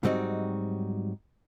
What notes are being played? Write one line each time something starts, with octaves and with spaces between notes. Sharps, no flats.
G#2 F#3 G3 C4 D#4 F#4